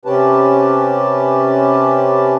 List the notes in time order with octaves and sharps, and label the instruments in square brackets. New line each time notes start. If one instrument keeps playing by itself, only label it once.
[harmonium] C3 C#4 G4 B4 A5